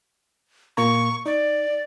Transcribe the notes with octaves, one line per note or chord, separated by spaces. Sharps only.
A#2 A#3 A#5 C#6
D#4 D5